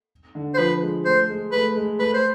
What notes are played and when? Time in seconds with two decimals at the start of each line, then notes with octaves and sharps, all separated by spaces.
0.35 D3
0.54 C5
0.58 F3 B4
0.82 G#3
1.05 A3 C5
1.29 G#3
1.52 A3 B4
1.76 G#3
1.99 A3 B4
2.14 C5